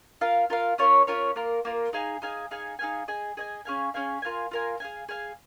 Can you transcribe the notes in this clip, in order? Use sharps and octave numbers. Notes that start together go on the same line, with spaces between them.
F4 A#4 F5
F4 A#4 F5
C#4 F4 A#4 C#5
C#4 F4 A#4 C#5
A#3 F4 A#4
A#3 F4 A#4
D#4 G#4 F5 G#5
D#4 G#4 F5 G#5
D#4 G#4 F5 G#5
D#4 G#4 F5 G#5
G#4 D#5 G#5
G#4 D#5 G#5
C#4 G#4 F5 G#5
C#4 G#4 F5 G#5
F4 A#4 F5 G#5
F4 A#4 F5 G#5
G#4 F5 G#5
G#4 F5 G#5